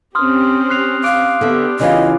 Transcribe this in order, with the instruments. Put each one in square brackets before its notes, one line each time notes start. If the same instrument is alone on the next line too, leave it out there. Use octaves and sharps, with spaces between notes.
[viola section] C4 C#4 G4 [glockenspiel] C6 D#6 F6
[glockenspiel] F#6 C7 F7
[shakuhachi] F5 [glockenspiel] D6 F#6 D7
[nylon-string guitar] D3 E5 [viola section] B3 D4 G4
[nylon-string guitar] C#3 E3 F4 [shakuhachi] D#5